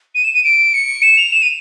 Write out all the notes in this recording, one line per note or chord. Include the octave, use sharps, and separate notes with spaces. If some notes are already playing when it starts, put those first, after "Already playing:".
D#7
E7
D#7
D7
C#7
E7
F7
E7
D#7